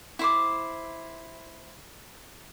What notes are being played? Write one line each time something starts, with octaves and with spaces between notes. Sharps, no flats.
E4 C5 D6